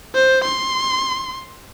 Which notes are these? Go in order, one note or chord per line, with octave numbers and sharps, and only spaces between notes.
C5
C6